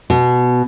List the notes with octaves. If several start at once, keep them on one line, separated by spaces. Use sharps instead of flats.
B2